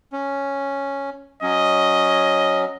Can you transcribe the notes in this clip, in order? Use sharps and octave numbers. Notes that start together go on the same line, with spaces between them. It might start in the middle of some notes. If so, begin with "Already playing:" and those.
C#4
F#3 C#4 D#5